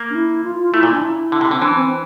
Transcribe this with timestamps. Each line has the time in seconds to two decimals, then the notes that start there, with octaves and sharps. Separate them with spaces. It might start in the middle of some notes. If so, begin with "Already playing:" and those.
Already playing: A#3
0.10 D4
0.15 E4
0.44 F4
0.59 F4
0.73 A3 E4
0.83 A#2
0.93 D4
1.03 E4
1.32 D3
1.41 C3
1.51 D3 C4
1.61 E3 D4
1.75 C4